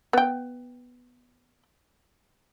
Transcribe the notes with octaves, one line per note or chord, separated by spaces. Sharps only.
B3 G5